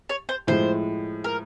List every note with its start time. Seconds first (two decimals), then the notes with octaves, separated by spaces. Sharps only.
0.09 C#5
0.29 C5
0.47 A2 F3 G#3 C5
1.24 A#4